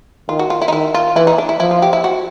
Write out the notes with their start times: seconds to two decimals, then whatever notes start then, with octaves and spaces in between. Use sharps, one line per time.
0.29 D#3 F4
0.39 F#4
0.50 F4
0.62 E4
0.68 D#4
0.72 D#3 E4
0.94 F4
1.16 E3 E4
1.27 D#4
1.38 D4
1.49 E4
1.59 F3 E4
1.71 F4
1.82 G4
1.93 E4
2.04 F#4